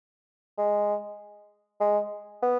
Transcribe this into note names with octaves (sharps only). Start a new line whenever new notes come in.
G#3
G#3
B3